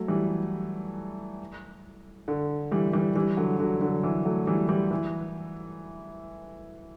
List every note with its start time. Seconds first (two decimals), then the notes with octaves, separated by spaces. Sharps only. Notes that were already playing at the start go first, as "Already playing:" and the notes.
Already playing: F#3 A3
0.08 E3 G3
2.28 D3
2.71 E3 G3
2.93 E3 G3
3.15 E3 G3
3.37 D3 F#3
3.59 D3 F#3
3.81 D3 F#3
4.03 E3
4.25 F#3 A3
4.47 E3 G3
4.68 E3 G3
4.91 E3